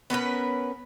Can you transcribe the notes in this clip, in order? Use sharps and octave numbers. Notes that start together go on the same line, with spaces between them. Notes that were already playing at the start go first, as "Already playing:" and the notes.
B3 C#4 A#4 B4